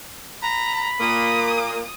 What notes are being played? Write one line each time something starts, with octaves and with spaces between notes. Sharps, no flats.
A#5 B5
A#2 A#3 D#6